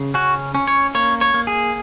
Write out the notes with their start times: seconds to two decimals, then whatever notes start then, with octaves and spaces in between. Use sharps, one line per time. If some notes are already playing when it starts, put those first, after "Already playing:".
Already playing: C#3
0.14 C#4 F#4
0.55 C#4
0.67 C#5
0.95 A#3 C#5
1.21 C#5
1.34 A#3
1.47 G#4